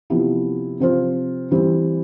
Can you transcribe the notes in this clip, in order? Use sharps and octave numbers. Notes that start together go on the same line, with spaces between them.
C3 F3 B3 E4 G4
C3 F3 C4 F4 C5
E3 G3 C4